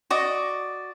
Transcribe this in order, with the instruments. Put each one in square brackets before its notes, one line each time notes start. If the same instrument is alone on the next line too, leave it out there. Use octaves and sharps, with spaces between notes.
[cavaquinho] F#4 D5 D#5